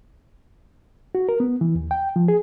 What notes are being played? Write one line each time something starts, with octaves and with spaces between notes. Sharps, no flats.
F#4
A#4
B3
E3
D#2
G5
F3
G#4